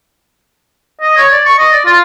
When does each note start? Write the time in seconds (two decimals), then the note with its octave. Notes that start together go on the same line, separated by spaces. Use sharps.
1.01 D#5
1.17 C#5
1.32 D5
1.46 C#6
1.58 D#5
1.72 D5
1.85 F4